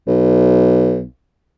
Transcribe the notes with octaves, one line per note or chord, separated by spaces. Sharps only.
B1